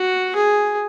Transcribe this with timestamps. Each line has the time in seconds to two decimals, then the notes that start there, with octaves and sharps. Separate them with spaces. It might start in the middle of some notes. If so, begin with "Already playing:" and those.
Already playing: F#4
0.36 G#4